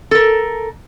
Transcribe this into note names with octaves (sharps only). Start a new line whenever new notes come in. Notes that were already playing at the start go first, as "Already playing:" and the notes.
A4 A#4